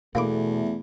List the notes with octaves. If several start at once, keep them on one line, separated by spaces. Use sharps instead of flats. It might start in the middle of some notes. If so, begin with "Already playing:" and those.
E2 B2 A3 A#3 B5 D6